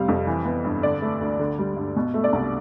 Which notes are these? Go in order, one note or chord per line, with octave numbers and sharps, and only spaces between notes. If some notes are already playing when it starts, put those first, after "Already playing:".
Already playing: F1 C3 G3 F5
F2
E3
B3
G2
D3 D5
A3
D2
D3
G3
G2
B2
A3
D5
C2